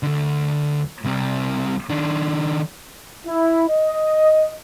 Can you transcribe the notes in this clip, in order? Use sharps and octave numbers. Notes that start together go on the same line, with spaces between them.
D2 D3
C2 C3
D#3 D4
E4
D#5